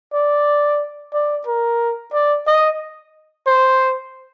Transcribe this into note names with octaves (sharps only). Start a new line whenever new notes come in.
D5
D5
A#4
D5
D#5
C5